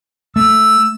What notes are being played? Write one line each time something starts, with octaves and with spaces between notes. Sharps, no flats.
A3 E6